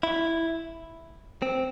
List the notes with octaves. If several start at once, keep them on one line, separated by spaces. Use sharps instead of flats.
E4
C4